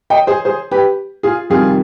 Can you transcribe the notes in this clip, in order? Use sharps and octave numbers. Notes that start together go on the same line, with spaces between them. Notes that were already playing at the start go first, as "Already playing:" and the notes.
D#5 G5
G#4 C5
G#4 C5
G4 B4
F4 G#4
F2 C3 D#3 G3 F4 G#4